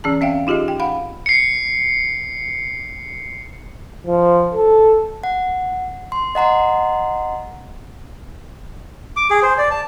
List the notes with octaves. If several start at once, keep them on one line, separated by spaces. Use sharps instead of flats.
E3 C#4 G#4 A5
C4 E5 F5 G5
D#4 F4 G4 G#4 D#5
G5
F5 F#5 B5
C7 C#7
F3
A4
F#5
C6
D#5 F#5 A#5 C6
D6
G#4
C5
D5
A5